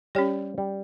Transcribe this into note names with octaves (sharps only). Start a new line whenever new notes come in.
G3 C#4 G4 C#5
G3